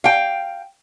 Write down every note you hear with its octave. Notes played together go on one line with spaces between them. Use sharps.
F5 G5